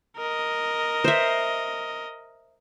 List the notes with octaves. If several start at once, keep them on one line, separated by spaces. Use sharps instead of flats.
A#4 D#5
C5 E5